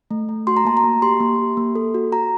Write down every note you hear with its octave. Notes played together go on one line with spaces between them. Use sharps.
A3
A3
F#4 C6
A#5
A#3 A5
A#5
A#3
G4 C6
A#3
G4
A#3
A4
F#4
F#4 A#5